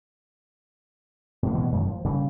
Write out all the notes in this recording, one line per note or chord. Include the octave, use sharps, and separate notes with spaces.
A2 A#3
G2 B2 E3
F#2 A2 D#3
F3
C#3 G3 A#3